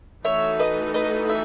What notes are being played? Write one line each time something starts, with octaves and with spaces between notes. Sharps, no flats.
E3 A3 D#4 F#4 A4 C#5 E5
B4 D#5
B4 D#5
E5